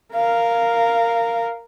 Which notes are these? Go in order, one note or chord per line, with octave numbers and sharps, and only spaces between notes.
A#4 F5